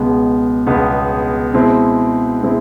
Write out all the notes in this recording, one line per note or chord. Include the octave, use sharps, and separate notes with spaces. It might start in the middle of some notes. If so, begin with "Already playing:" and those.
Already playing: C#2 B2 G#3 B3
C#2 B2 G#3 B3
B2 G#3 C4 E4
B2 G#3 C4 E4